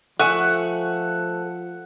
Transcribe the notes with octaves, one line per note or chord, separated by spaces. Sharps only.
F3 A3 F#5 G#5 C#6